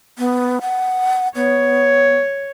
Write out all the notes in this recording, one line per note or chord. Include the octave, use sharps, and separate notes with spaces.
B3
F#5
B3 C#5